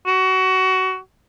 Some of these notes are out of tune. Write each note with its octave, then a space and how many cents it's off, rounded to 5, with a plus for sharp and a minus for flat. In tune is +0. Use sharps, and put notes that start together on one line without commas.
F#4 +20